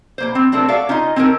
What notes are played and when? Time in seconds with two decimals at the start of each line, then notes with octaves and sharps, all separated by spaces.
0.18 B2 A#3 C5
0.35 C4
0.52 B2 A3 C4 D4 A4 A#4
0.68 F#4 A4 D5 E5 F5
0.89 C#4 D#4 F4 D#5
1.16 C4 C#4 D#4 A4 A#4